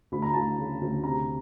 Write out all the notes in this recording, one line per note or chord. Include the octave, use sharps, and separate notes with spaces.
D2 B5
A#5
D2 A5
A#5
C#3
D2
C3 A#5